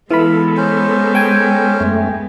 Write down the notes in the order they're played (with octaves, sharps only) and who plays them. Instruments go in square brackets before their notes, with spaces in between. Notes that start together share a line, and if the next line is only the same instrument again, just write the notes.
[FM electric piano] E3 B5 [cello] G#3 B3 [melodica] F4 [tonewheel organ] A4
[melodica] C#4 C5
[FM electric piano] G5 G#5
[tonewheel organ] F#2 A3